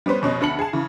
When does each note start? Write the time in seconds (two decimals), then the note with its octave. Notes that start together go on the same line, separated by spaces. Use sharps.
0.06 G3 B3 C#4 B4 C5
0.21 F1 B2 C#4 D#5
0.41 D2 D3 A4 B5 C#7 F#7
0.59 G#4 A5
0.73 C#3 E3